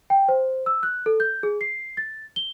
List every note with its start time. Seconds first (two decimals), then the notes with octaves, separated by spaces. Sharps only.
0.10 G5
0.29 C5
0.66 E6
0.83 F#6
1.06 A4
1.20 G6
1.43 G#4
1.61 C7
1.97 A6
2.36 G7